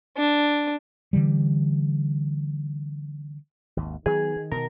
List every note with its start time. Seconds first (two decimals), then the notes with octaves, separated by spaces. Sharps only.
0.17 D4
1.13 D3 E3 G3
3.77 G#1 D#2
4.06 D#3 F#3 B3 G#4
4.36 D#3
4.52 B2 D#3 A#4